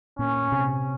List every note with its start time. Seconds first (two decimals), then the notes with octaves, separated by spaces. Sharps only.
0.19 A#2 C#4
0.52 C3